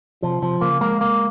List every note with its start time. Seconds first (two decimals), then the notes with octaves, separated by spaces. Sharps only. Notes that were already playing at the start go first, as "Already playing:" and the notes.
0.22 C3 F3
0.42 C3 F3
0.61 C#3 A#3
0.81 G#3 A#3
1.01 A#3